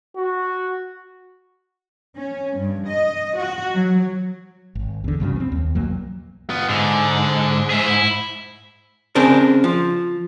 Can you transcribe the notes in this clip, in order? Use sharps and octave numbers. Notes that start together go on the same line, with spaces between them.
F#4
C#4
G2
D#5
F#4
F#3
G#1
E2 D3
C2 G2 C#3 F#3
B3 C4
D#2
B1 F2 F#3 A#3
B3 F4
G#2 D3
G#4 E5
E4
C#3 C4 D4 A#4
F3